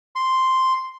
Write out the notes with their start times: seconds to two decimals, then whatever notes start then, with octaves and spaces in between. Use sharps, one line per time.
0.16 C6